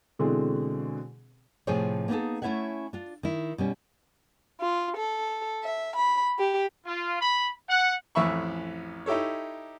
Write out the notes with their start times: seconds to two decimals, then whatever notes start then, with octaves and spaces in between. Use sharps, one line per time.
0.19 B2 D3 E3 G#3 C4 G#4
1.67 A2 C3 F3 G#4 C5 C#5
2.08 A#3 B3 D#4 F4 G#4 A4
2.42 A3 C#4 E4 C#5 E5 F#5
2.93 D4 F4
3.23 D#3 E4
3.58 B2 G3 C#4
4.60 F4
4.96 A4
5.64 E5
5.97 B5
6.38 G4
6.85 F4
7.21 B5
7.69 F#5
8.15 A1 F2 E3 E5 B5 C#6
9.06 D#4 E4 G4 A4 C#5